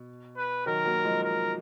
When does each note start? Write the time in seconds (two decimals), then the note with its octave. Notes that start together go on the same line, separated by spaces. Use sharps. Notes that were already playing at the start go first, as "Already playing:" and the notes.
Already playing: B2
0.37 B4
0.66 D#3 F#3 A#4
0.85 F#3 A#3
1.05 F3 G#3
1.23 A#4